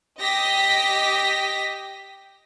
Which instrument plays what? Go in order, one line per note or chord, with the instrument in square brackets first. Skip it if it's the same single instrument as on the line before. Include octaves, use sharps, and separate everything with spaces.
[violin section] G4 D#5 A#6 B6